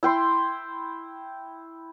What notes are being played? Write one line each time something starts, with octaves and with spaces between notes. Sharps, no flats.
E4 G5 C6